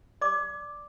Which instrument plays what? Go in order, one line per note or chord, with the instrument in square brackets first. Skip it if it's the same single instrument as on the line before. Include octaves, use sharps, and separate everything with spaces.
[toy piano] D5 D6